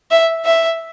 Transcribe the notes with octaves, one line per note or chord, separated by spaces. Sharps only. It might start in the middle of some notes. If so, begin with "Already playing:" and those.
E5
E5